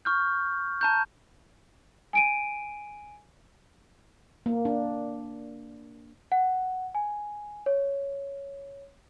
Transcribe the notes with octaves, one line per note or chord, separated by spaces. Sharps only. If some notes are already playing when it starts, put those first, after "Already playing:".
C#6 F6 G6
A5 A#5 G6
G#5 D7 D#7
A#3
D4
F#5
G#5
C#5